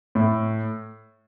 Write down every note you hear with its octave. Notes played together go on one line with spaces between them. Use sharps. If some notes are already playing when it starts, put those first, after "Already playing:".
A2